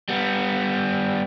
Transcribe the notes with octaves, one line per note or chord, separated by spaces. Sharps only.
G3 B3